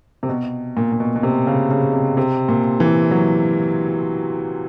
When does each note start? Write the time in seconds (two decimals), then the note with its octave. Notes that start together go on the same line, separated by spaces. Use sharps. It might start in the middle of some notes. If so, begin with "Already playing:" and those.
0.23 C3
0.29 B2
0.77 A#2
0.92 A#2
1.00 B2
1.16 B2
1.23 C3
1.47 C#3
1.71 C#3
1.93 C3
2.17 C3
2.48 A#2
2.80 E3
3.11 F#3